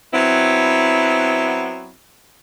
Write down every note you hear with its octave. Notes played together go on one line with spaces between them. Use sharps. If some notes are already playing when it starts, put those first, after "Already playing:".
F#3 B3 C4 E4